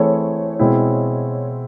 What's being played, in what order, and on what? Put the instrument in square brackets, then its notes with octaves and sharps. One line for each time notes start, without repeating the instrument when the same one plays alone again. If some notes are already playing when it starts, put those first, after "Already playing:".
Already playing: [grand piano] E3 A3 C4 E4 G#4 [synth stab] C#5
[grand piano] B2 G#3 C4 E4